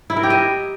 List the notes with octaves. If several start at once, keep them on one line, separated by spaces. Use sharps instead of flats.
E4
A#4
G4
D#5